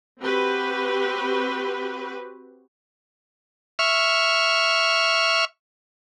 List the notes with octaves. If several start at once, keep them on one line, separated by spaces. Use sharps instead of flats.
C4 F#4 G4 B4
E5 C#6 F6